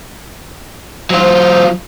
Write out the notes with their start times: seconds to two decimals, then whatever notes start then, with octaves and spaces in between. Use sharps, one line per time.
1.10 F#3 F4 C5